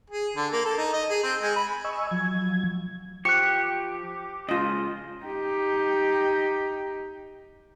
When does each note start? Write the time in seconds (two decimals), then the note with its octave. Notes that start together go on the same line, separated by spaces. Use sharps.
0.10 G#4
0.36 D3
0.52 A#3
0.65 A4
0.78 D#4
0.93 D#5
1.10 G#4
1.23 C4
1.42 G#3
1.56 B5
1.84 D#5 G#5 C#6 E6
2.11 F3 F#3 G#6
3.25 F3 G4 C#6 F#6 C#7
4.49 C#3 G#3 F4 D#5
5.24 D#4 G4